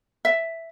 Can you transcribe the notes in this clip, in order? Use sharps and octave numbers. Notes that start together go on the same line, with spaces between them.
E5